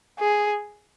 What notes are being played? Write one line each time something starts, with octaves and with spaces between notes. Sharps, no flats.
G#4